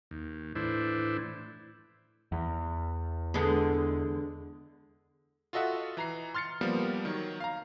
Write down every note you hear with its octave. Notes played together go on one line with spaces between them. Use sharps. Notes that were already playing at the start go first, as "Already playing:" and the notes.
D#2
A2 E3 D4 E4 C5
E2
D3 G#3 B3
F4 F#4 A4 D#5 E5 F#5
E3 A#5 C7
C6 F6 A6 C7 C#7
F3 G3 A#3 B3
D#3 F#3
F5 A#5